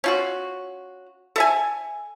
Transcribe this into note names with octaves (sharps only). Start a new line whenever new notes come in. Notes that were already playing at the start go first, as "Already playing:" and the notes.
C#4 F4 F#4
A4 E5 G#5